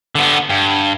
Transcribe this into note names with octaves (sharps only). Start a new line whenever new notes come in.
D3 B3
G2